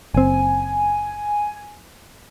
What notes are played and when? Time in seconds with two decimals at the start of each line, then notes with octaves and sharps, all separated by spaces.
0.14 F#1 C4 G#5